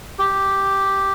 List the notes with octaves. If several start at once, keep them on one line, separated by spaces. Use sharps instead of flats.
G4